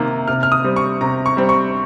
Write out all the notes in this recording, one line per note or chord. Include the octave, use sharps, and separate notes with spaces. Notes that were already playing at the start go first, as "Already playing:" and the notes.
Already playing: C3 D#3 A#3
C3 F6
F6
D#6
G3 C4
C#6
C3 A#5
C#6
G3 C4
C#6